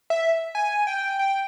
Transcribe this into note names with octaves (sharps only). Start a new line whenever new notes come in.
E5
G#5
G5
G5